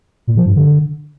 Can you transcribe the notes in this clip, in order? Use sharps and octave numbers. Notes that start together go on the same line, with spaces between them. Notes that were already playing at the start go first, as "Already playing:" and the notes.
A#2
F3
G2
D3